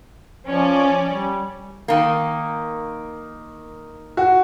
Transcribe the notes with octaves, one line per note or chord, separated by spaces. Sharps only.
F3 C#4 D5
G3
D#3 A#3
F#4